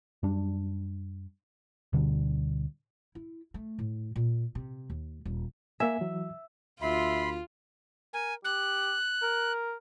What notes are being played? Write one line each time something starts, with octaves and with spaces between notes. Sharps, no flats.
F#2 G3 D4
D2 B2 D3 G3
E4
A3
A2
A#2
C3
D#2
D#1
A#3 E5 G#5
E3 F#3
D2 F4 E5 B5 C6
A#4 G#5
G4 F#6
A#4